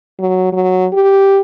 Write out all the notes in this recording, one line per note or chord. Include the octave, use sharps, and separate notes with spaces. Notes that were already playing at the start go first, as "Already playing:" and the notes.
F#3
F#3
G4